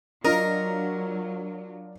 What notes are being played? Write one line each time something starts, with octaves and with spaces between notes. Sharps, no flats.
F#3 D4 F4 A#4 D#5